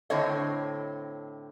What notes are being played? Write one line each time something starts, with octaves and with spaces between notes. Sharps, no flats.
A2 D3 C4 C#5 D#5